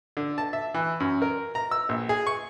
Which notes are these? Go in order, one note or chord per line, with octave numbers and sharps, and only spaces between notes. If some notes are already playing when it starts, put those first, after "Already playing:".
D3
A5
E5
E3
F#2
A#4
A#5
E6
A#1
G#4
C#6